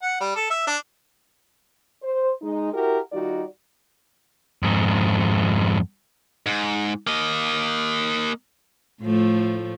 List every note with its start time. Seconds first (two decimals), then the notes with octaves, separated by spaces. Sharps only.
0.03 F#5
0.21 G3
0.36 A4
0.50 E5
0.67 D4
2.03 C5
2.42 G#3 D#4
2.74 E4 F#4 G4 A#4
3.13 D#3 G3 D#4 F4 F#4 D5
4.63 F2 G#2
6.46 G#2
7.07 A#3 D#5
9.02 A2 F3 A3